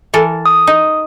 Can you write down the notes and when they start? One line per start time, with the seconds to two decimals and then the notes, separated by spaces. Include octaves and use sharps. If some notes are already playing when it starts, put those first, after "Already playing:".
0.14 E3 A4 A#4
0.46 D#6
0.67 D#4